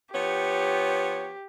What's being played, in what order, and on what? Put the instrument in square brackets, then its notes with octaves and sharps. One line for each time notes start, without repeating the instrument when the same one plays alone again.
[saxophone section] F3 B3 C#5 [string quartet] G4